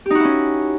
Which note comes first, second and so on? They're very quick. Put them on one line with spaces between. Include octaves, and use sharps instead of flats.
G4 D#4 F#4 E4 C#4